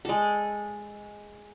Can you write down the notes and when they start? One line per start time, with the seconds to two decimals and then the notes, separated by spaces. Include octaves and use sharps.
0.05 G#3 A4